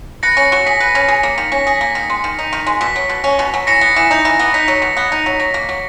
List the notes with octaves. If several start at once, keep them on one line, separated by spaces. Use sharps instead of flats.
B4 A#6 C#7
C#4
F#3
G#4 B6
B4
C#4
G#4
A#3
D#3
C#4 B6
G#4 A#6
B6
A#3
D#3 A#6 C#7
G#3
D#3
D#4
D#3
G#3
B2 B6
F#3
B2
C#4
B2
F#3
E3 A#6 C#7
B3
E3
D#4
E3
B3
D#4 B6
F#3
B2
B3
D#4
F#3
F#3 A#6
A#3
F#3